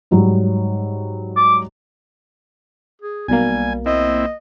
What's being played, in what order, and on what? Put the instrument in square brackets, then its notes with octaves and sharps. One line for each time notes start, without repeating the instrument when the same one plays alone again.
[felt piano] G#2 F#3 G3
[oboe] D6
[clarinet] G#4
[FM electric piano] B1 B2 A#3 [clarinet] G3 [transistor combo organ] G#5
[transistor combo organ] C4 E4 [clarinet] D#5